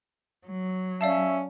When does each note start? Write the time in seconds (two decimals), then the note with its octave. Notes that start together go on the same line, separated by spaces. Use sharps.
0.46 F#3
1.01 C#4 D5 E5 F5 A5